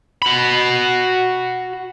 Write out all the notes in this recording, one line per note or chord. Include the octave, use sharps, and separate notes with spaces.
F#4 B5